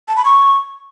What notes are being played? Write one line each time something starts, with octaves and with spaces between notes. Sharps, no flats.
A5
B5
C#6